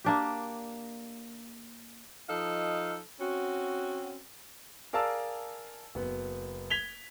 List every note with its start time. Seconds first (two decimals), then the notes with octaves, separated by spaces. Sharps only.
0.05 A#3 D4 G4
2.29 F3 D#4 A4 D#5 F5
3.21 C4 C#4 F#4
4.93 G#4 A#4 D5 F5 A5 E6
5.95 F#1 B3
6.70 G#6 B6 F7 G7